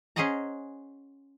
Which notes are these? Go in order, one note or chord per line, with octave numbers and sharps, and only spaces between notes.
C#4 G#4 C5 D#5 F#5 A#5